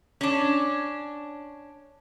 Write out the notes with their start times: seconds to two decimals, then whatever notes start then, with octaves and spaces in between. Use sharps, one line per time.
0.21 C#4 D4